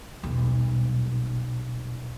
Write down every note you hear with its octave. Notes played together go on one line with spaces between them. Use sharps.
D#1 B1